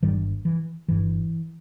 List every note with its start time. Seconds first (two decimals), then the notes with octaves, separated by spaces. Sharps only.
0.03 G1 G2 D#3 G3
0.45 E3
0.88 G1 G2 E3